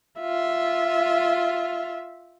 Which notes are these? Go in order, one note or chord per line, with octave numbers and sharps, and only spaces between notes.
F4 E5